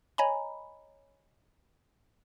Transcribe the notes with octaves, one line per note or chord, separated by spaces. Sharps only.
C#5 D#5 G#5 A#5 B5